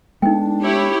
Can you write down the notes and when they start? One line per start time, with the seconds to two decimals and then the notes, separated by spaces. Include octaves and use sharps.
0.22 G#3 A3 B3 D4 D#4 G5
0.62 E4 G4 C#5